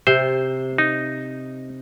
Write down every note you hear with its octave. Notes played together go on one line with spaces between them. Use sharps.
C3 C5
D#4